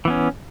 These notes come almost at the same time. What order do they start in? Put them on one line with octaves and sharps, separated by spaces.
E3 B3 C#4